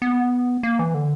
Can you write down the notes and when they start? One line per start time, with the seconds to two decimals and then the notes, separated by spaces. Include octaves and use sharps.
0.02 B3
0.63 A#3
0.79 E3
0.94 D3